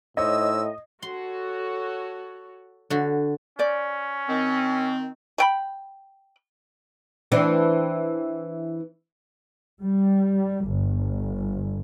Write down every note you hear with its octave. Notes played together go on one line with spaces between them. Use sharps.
A2 D#4 C5 C#5 D#5 E6
F#4 A4 C#5 C6
D3 F#4
C#4 C5 D5
D#3 C4
A3 G5 B5
E3 C4 D4
G3
G1